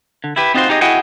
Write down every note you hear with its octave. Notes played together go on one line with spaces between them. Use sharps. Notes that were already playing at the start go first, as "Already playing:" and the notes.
D3
E4 G4 B4
C4 D#4 F4 F#4 C5 C6
D#4 G4 G#4 D5 D#5
E4 F#4 G#4 D#5 F#5 G5